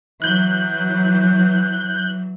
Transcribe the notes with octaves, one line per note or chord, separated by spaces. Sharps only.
E3 F#3 F#6 G6